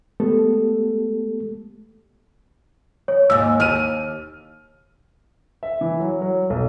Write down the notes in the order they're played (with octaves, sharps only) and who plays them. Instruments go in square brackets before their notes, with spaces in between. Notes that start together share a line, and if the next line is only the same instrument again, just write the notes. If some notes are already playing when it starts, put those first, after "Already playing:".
[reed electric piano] G#3 A3 B3 G4 A4
[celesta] C#5
[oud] D#2 G#2 [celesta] E6
[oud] D#2 [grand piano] F6 D#7
[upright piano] E5
E3
F#3
F#3
B1